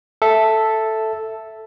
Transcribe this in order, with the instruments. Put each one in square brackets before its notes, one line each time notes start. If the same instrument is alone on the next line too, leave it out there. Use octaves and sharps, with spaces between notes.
[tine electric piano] A4 E5